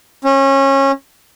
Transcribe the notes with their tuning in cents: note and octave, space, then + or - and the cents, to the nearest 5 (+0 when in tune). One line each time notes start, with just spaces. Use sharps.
C#4 -25